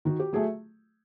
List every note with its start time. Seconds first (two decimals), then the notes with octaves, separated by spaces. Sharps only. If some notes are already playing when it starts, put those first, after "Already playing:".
0.05 D#3 F#4
0.20 G4
0.33 F#3 A3 G#4